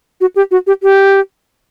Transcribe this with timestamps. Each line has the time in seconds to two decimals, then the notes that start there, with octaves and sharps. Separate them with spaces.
0.21 F#4
0.36 G4
0.51 F#4
0.67 G4
0.83 G4